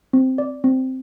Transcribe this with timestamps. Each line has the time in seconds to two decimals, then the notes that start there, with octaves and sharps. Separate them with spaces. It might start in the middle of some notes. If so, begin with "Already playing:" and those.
0.13 C4
0.38 D5
0.64 C4